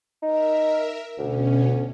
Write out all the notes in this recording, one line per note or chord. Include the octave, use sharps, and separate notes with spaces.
D#4 A#4 E5
D2 B2 C#4